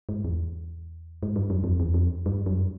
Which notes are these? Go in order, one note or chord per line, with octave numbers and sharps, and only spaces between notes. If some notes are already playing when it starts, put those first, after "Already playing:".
G#2
E2
G#2
G2
F#2
F2
E2
F2
G2
F#2